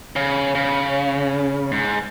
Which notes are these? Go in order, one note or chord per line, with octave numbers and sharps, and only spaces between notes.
C#3
C#3
G#2